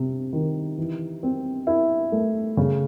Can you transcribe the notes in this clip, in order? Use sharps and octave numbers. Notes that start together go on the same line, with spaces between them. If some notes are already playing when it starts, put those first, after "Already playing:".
Already playing: C3
D#3
E3
C4
E4
A3
C#3